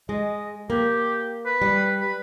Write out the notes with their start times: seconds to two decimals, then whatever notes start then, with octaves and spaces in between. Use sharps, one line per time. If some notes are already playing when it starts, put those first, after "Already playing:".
0.09 G#3 D#5
0.70 A#3 G4
1.46 B4
1.62 G3
2.01 B4